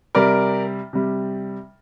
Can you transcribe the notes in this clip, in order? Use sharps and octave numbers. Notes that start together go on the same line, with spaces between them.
C3 G3 A#4 D5
C3 G3